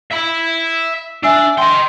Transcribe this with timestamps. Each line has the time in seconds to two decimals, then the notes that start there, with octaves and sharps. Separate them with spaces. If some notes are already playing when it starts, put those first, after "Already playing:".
0.11 E5 B5
1.23 D4 E5 G#5 E6
1.58 D#5 G5 C6